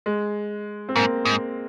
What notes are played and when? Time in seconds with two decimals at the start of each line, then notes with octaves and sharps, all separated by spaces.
0.06 G#3
0.89 C4
0.95 G#2 A#3
1.25 G#2